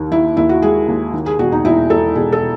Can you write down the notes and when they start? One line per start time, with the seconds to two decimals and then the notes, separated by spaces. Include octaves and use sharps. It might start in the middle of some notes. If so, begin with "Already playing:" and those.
Already playing: D#2 D#3
0.12 D#3 E4
0.37 D#2 E4
0.49 F#4
0.62 G#3 G#4
0.88 D#2
1.13 D#3
1.26 G#4
1.39 E1 F#4
1.52 D#4
1.65 E1 E4
1.90 E1 A4
2.15 E1 G#4
2.32 A4